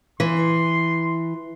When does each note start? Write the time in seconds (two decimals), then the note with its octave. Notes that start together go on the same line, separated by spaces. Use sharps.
0.20 E3 C6